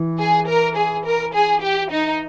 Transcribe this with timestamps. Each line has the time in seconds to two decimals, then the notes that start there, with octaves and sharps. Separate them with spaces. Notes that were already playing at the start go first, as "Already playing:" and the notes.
Already playing: E3
0.19 G#4
0.47 A#4
0.76 G#4
1.05 A#4
1.33 G#4
1.62 G4
1.90 D#4